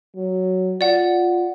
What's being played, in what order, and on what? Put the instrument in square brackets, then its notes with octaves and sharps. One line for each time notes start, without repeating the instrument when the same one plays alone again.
[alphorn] F#3
[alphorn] F4 [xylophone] D5 F#5